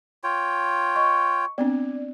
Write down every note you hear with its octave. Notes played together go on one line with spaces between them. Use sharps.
F4 C#5 G5
D#5 C#6
B3 C4 D4 D5